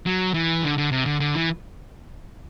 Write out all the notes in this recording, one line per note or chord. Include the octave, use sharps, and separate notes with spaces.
F#3
E3
D3
D3
C3
D3
D3
E3